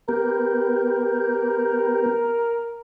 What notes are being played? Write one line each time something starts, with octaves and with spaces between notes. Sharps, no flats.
B3 G4 A#4